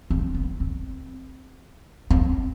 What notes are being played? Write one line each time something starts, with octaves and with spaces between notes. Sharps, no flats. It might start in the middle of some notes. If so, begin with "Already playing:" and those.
C4
B3
C4
C4